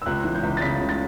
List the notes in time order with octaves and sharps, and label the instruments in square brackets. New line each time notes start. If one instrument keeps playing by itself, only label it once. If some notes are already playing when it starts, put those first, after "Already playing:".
[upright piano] E6
C#2 F#6
E3
G6
C#2
A6
C#3 B6
C#2
A6